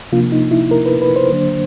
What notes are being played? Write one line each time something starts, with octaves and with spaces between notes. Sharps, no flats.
C3 F3 A#3 D4 F4
D#4
E4
A#4
B4
B4
C5
D3 F#3 A#3 D4